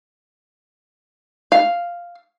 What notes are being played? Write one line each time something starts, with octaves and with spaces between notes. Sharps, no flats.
F5